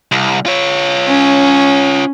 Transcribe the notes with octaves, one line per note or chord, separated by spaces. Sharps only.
C2
F4 C#5
C#4